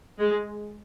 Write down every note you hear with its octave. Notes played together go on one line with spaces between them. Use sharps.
G#3